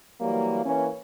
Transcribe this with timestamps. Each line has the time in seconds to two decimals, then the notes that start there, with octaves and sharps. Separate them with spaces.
0.21 E3 F#3 G3 A#3
0.64 E3 A#3 C#4